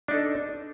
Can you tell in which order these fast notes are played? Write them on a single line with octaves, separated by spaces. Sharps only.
D4 D#4 A4